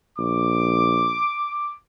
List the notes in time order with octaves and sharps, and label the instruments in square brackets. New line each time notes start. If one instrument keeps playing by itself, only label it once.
[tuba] A#1 [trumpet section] D6